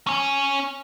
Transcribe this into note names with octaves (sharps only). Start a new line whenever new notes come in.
C#4 G#5